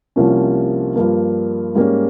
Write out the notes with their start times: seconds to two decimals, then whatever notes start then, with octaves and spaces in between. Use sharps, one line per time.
0.16 C2 C3 F3 A#3 C#4
0.96 G2 F3 A#3
1.75 G#2 G3 A#3 C#4